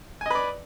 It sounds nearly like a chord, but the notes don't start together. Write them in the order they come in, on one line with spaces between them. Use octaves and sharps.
G#5 D#5 B4 D5